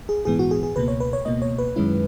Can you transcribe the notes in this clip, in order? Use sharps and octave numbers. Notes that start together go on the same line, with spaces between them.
G#4
A#1 G#2 E3 B3 G#4
F#4
G#4
G#4
C#2 B2 A#3 B4
C#5
B4
C#5
C#2 B2 A#3 D#5
C#5
B4
F#2 D#3 G#3 C#4 E4